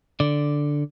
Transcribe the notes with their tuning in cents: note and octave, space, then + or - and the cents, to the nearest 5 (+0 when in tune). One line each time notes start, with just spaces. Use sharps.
D3 +0 D5 +0